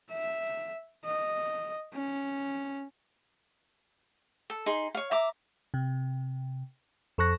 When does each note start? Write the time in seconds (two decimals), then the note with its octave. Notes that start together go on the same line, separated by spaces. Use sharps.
0.12 E5
1.05 D#5
1.94 C#4
4.50 A4
4.66 D#4 G#4 C6
4.95 C#5 F5
5.11 E5 A#5 D6
5.74 C3
7.18 F2 A4 C#6 F#6 A#6